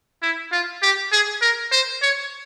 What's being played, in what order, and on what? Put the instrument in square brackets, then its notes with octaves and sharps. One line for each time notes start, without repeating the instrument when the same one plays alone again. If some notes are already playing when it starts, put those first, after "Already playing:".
[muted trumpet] E4
F4
G4
G#4
A#4
C5
C#5